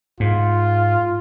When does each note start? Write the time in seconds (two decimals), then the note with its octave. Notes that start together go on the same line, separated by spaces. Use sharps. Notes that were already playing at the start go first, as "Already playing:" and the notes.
0.20 G#2 F4